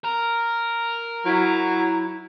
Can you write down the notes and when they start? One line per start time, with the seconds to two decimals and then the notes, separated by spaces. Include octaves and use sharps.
0.04 A#4
1.25 F#3 E4